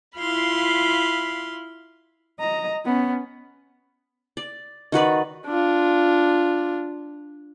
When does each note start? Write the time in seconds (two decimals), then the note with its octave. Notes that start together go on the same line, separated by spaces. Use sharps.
0.18 E4 F4 F5 B5 C6
2.40 D#5 A#5
2.85 B3 C#4
4.37 D5
4.92 D#3 F#4 B4 D5
5.46 D4 F4